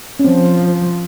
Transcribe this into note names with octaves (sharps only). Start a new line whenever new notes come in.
C#4
F3 C4